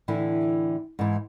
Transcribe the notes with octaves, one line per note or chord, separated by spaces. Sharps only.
A2 D3 E3 E4
G#2 E3